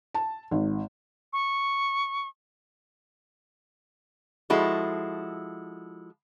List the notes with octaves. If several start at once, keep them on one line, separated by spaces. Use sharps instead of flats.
A5
G#1
C#6
F3 G#3 E4 F#4 A4